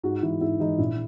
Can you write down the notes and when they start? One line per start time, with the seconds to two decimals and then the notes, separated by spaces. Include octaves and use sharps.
0.03 G#2 F#4
0.23 E3 G#3 E4
0.41 G#2 E4
0.60 E3 G#3 D#4
0.78 A#1 E4